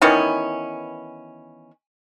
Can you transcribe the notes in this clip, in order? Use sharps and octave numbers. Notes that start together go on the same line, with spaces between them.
D#3 E3 B3 C#4